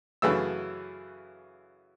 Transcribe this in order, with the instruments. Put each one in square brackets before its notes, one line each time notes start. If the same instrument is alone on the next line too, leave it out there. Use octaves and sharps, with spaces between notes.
[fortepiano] F#2 C#3 E3 A3 E6